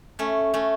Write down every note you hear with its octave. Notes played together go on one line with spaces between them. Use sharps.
A3 C#4
A3 C#4